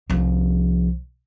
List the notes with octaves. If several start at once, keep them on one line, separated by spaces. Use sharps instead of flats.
C2 F3